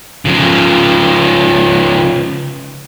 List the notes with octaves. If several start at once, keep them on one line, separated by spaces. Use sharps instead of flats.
C#3 F3